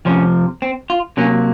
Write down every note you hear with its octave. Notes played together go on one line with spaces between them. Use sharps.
F2 C3 F3 C#4
C4
F4
C3 F#3 A#3 C#4